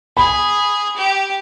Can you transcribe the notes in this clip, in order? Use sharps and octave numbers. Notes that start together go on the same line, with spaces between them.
G#4 B5
G4